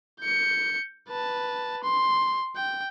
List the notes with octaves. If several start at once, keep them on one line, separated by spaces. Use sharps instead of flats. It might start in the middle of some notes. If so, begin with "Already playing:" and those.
G6 C#7
B4 A5
C6
G5